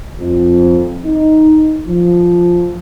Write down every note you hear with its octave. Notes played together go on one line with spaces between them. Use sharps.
F2
D#4
F3